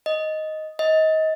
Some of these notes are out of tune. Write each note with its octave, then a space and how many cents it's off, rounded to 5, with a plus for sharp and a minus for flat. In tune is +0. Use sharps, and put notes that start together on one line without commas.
D#5 +5
D#5 +25